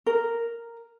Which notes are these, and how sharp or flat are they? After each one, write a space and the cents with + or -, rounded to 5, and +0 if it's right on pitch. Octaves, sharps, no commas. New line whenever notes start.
A#4 -5